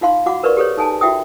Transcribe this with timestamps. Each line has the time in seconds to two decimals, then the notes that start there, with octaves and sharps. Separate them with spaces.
0.01 D#4 F4 F5 C6
0.26 F4 F#4 D#5 F#5 D6
0.43 A#4 B4 D5 D#5 C#6
0.57 G4 A4 B4 C#5
0.77 D#4 A4 G#5 A5
1.01 F4 F#4 E5 G5 D#6